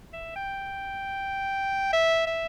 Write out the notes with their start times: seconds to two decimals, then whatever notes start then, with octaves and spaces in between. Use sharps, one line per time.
0.13 E5
0.36 G5
1.93 E5
2.27 E5